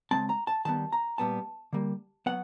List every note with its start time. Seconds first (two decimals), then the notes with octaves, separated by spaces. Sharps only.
0.11 C#3 E3 G#3 C4 A5
0.29 A#5
0.47 A5
0.65 D#3 G3 B3 A5
0.92 A#5
1.18 A#2 G3 B3 A5
1.73 D3 G3 A#3
2.26 F#3 B3 F#5